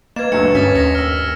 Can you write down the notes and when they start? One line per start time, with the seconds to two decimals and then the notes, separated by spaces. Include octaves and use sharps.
0.16 A#3 B4 D#5 G#6 E7
0.32 E1 D2 F#3 A3 D4 B4 C#7
0.55 G2 C#4 B4 D#6 A6 B6
0.75 D#2 A#6 C#7
0.95 E6 F6